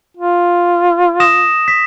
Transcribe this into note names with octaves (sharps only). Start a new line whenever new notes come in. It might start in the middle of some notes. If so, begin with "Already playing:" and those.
F4
D#6 A#6 E7
B6